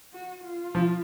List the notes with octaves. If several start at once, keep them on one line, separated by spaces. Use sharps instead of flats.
F#4
F4
F3